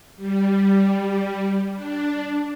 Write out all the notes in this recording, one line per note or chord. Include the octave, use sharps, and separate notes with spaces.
G3
D4